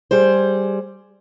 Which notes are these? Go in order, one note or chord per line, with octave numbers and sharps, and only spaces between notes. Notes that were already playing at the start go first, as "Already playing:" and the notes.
G3 G#4 C5